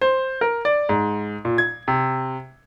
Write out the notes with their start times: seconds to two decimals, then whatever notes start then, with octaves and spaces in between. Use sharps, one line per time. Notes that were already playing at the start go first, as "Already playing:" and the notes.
0.01 C5
0.41 A#4
0.65 D5
0.89 G#2
1.45 A#2
1.58 G#6
1.88 C3